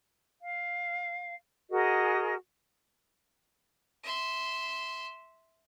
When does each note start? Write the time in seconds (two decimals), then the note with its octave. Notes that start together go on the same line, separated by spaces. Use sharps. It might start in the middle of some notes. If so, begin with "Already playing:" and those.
0.40 F5
1.70 F#4 G#4 A#4 D#5
4.03 E5 C6